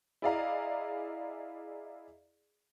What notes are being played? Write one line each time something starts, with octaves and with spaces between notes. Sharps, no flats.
E4 G#4 D5 D#5 F5 A#5